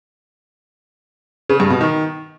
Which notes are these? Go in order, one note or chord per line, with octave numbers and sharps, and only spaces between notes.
C#3
G2
B2
D#3